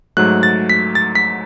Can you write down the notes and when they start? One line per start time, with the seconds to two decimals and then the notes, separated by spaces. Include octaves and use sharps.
0.17 G#2 F#3 A3 F#6
0.43 A6
0.70 B6
0.95 A6
1.15 B6